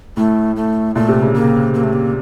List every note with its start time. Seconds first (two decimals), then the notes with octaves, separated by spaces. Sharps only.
0.17 A2 A3
0.56 A3
0.95 A#2 A3
1.09 C3
1.22 C#3
1.34 C#3 A#3
1.74 A#3
1.83 A3
1.93 A#3